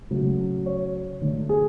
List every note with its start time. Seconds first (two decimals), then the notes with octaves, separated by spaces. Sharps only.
0.11 C#3 F#3 A3
0.66 C#5
1.22 D3 A3
1.49 G#4